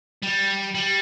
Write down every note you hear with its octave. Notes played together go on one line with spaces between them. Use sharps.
G3
G3